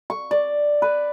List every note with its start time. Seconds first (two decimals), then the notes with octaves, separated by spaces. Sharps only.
0.10 C#6
0.31 D5
0.82 B4